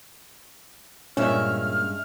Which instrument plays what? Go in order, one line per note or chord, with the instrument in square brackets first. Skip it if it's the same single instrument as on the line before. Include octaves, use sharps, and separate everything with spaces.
[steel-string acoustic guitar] G2 G#3 E5 [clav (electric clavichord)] A#2 [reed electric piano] C#4 [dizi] F6